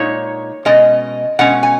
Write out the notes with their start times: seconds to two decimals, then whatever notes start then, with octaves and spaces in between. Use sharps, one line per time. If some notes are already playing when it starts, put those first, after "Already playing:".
Already playing: A#2 G#3 D#4 C#5
0.65 B2 G#3 C#4 D#5
1.39 B2 G#3 C#4 F#5
1.63 G#5